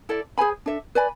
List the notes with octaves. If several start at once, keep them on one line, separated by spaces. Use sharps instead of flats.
E4 A4 D5
G#4 C5 G#5 B5
D4 A4 E5
B4 D5 G#5 B5